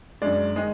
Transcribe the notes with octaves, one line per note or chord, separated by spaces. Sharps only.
F#2 D3 G#3 D5
D#3 G#3 D#5